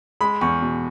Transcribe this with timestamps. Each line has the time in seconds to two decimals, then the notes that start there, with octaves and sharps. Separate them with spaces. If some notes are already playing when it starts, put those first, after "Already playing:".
0.21 G#3 B5
0.41 E2 C#6
0.62 B2